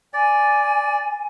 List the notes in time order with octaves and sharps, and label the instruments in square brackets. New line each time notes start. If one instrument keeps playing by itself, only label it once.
[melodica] D5 [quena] G#5